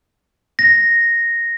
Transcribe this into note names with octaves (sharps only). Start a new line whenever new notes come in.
A#6